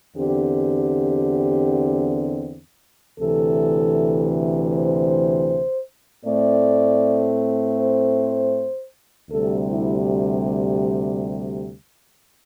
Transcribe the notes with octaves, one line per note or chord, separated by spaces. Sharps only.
E2 D3 C4 G4
D2 C3 E3 A4
C5
A2 A3 C4 D5
C5
D2 C3 G3 A4
E4